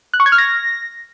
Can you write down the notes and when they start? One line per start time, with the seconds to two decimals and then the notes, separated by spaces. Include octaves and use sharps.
0.14 F#6
0.20 C#6
0.26 G#6
0.32 F6
0.38 A#6